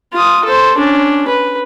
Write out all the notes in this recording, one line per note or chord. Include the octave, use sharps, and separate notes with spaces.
F4 D#6
A4 C5
C#4 D4
B4